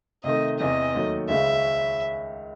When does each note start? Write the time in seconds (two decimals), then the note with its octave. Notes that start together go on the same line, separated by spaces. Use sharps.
0.24 C3 D#3 A3 D#5
0.59 E2 C3 E3 D#5
0.94 D#2 D#3 F#3 A3
1.28 C#2 C#3 G#3 C#4 E5